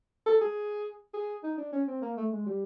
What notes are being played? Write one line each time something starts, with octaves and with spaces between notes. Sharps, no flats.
A4
G#4
G#4
D#4
D4
C#4
C4
A#3
A3
G#3
G3